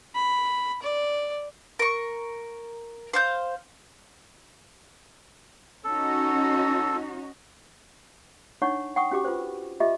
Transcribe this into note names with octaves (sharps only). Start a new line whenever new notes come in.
B5
D5
A#4 C#6
C5 F5 G6
C#4 D#4 F#4 A4
D4 D#4 C#5 F#5 C#6
F#5 G5 C#6 D#6
C#4 F#4 G4 D6
F4 B4 C5
F4 G4 D#5 E5 D6